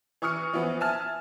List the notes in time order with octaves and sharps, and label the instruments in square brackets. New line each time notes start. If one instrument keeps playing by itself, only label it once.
[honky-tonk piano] E3 C#6 D#6 F6 C#7
E3 F3 B3
E5 G#5 A5 F6